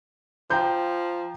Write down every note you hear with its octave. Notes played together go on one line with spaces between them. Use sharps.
F3 G5 A#5 G6